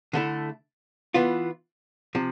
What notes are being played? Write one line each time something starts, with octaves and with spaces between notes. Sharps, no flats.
D3 A3 E4 A4
E3 B3 F4
C3 F3